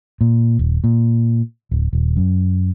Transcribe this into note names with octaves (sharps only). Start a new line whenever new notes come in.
A#2
D#1
A#2
D1
D#1
F#2